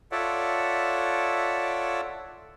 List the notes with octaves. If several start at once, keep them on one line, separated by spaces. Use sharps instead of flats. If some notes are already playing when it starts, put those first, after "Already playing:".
F4 A4 C#5 D5 E5 F#5